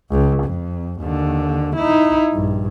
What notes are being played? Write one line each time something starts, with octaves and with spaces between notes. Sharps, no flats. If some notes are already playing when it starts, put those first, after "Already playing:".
C#2
F2
D#2 D3
D#4 E4
A#1 G2